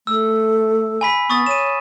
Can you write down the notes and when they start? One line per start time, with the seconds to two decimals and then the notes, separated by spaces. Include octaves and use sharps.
0.07 A3 E6
1.01 G#5 B5 B6
1.30 B3 C#6 D#6 A6
1.46 C#5 D#7 E7